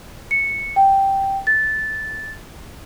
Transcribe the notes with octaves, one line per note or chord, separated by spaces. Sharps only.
C#7
G5
A6